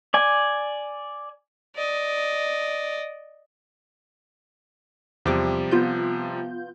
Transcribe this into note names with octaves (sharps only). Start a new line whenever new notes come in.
D5 G#5
D5 D#5
E2 C3 F3 G3 G5 D6
B3 F4 G6